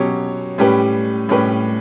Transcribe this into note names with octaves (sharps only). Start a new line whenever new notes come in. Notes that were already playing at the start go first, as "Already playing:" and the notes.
Already playing: B2 F#3 C#4 G4 C#5
A2 G3 C#4 G4 B4
A2 G3 C#4 G4 B4